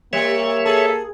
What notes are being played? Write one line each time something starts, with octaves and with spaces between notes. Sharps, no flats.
G3 A#3 C#5 E5
G#4 A4